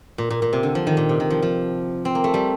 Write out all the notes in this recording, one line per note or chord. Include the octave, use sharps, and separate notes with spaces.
A#2
A#2
A#2
C3
D3
F3
D#3
A#2
C3
D#3
F3
F3
C4
A#3
A3
G3